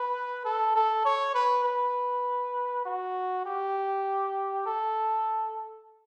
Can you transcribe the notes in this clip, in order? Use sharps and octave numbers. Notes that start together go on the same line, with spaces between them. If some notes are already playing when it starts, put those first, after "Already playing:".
Already playing: B4
A4
A4
C#5
B4
B4
F#4
G4
A4